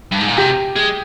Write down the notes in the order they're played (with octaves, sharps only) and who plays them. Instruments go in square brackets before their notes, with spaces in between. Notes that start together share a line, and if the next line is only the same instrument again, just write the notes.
[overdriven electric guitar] G2
G#2
A#2
[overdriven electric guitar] C3 [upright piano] G4
[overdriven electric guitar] G#3